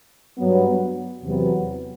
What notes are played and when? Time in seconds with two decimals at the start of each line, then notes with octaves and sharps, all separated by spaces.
0.37 G2 F#3 B3
1.23 E2 C3 F#3 B3